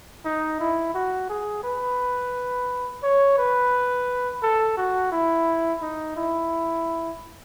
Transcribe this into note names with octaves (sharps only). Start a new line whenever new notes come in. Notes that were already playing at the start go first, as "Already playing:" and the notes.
D#4
E4
F#4
G#4
B4
C#5
B4
A4
F#4
E4
D#4
E4